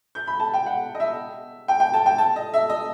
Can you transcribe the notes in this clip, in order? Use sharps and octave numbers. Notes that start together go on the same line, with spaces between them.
G6
B5
A5
G5
F#5
D#5
E5
G5
G5
A5
G5
A5
D#5
E5
D#5